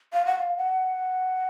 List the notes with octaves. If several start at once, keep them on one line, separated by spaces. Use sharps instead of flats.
F5
F#5
F5
F#5